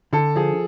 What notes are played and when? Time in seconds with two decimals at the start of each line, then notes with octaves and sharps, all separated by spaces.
0.13 D3 A4
0.36 F3 G#4